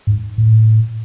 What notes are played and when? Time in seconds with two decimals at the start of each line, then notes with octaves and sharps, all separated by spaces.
0.07 G#2
0.38 A2